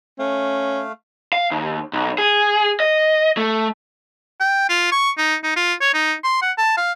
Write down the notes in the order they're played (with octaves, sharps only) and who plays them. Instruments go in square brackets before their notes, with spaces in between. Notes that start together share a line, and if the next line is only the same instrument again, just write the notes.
[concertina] A3 F5 [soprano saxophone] C#4
[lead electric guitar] F5
D#2
B1
G#4
D#5
A3
[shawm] G5
F4
C#6
D#4
D#4
F4
C#5
D#4
C6
F#5
A5
F5